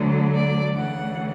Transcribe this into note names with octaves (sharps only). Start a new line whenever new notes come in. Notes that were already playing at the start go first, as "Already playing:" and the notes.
Already playing: D2 D3 F#3
D5
D2 C#3 E3 F#5